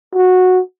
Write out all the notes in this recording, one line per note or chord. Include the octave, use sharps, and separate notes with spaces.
F#4